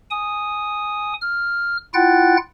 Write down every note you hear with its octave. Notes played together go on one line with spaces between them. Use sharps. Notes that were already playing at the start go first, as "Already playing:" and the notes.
G#5 D#6
F6
E4 F4 F#5 G5 F#6 A6